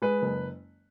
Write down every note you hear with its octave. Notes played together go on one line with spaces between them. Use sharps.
G#3 B4
F#1